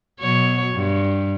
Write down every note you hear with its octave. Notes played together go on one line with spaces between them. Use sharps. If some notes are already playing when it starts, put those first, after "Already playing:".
B2 F#3 C#5
G2